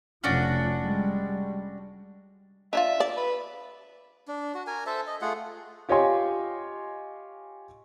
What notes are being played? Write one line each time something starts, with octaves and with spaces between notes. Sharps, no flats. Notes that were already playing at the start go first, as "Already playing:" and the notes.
F1 F3 C#4 D4 F#4
G3 G#3
D4 D#4 F4 E5
D5
B4
D4
F#4
A#4 G#5
A4 C5 E5 A5
D#5
A3 F4 G#4 F#5
F4 G4 C#5 D#5 G#5 C6